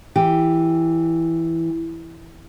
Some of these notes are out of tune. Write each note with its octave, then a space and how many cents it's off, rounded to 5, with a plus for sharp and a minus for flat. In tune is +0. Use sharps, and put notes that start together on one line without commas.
E3 +0 G4 +0